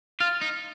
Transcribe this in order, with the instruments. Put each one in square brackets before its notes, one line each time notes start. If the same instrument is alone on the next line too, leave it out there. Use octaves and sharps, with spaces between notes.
[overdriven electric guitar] F4 [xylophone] F6 A6
[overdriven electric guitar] D#4